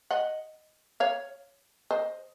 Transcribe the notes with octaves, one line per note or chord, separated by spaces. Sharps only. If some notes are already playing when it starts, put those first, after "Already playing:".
D#5 F#5
C#5 F5
C5 D#5